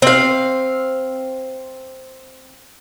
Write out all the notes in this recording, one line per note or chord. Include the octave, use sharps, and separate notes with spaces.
C4 F5